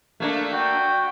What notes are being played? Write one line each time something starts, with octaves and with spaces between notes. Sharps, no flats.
A3 A#3 D4
F#4 G5